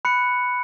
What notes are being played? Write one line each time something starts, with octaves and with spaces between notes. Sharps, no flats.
B5 F#6 C#7